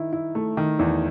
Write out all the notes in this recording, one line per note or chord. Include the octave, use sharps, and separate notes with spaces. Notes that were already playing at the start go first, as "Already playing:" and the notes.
Already playing: D#3 E4
E4
A3
D#3
E2